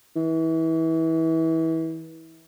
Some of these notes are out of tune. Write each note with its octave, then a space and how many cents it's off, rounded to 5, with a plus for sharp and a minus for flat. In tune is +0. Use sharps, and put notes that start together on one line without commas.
E3 -25